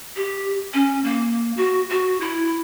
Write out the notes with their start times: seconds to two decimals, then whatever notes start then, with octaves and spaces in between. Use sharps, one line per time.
0.16 G4
0.74 C#4
1.04 A#3
1.57 F#4
1.90 F#4
2.20 E4